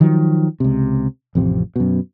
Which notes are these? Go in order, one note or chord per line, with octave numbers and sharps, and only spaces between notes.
D#3 F3 F#3
C#2 C3
A1 F2 C3
F#2 B2